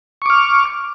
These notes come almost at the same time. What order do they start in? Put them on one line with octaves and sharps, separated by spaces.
C#6 D6 F6